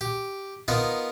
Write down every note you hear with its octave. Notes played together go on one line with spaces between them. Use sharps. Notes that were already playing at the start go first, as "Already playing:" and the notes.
G4
B3 D#4 F4 A#4